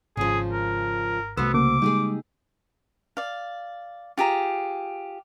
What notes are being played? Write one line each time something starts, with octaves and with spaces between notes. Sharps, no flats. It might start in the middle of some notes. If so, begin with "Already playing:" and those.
G#1 C#3 F3 G#4
A#4
C2 C3 A3 B3 F#4 C5 E6
C#3 A#3 D6
G3 G#3 D#4 G4 G#4
D5 F5
F4 G4 G#4 A#5